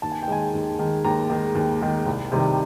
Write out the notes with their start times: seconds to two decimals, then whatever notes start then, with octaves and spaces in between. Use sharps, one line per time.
0.02 D#2 A5
0.12 G#5
0.23 G5
0.28 D#3 G#3 G#5
0.54 D#2
0.79 D#3 G#3
1.04 D#2 A#5
1.30 D#3 G#3
1.55 D#2
1.81 D#3 G#3
2.06 C2
2.32 C3 D#3 G3